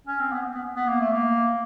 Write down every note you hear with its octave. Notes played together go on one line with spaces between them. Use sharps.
C#4
C4
B3
B3
B3
A#3
A3
A#3